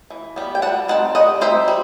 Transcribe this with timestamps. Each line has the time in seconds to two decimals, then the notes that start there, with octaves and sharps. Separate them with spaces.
0.10 E3
0.36 G3 B3
0.55 G5
0.62 G3 F#5 A5
0.88 C4 D#4 F#5 A5
1.15 G3 D#5 F#5
1.41 C4 D#4 C5 E5
1.68 G3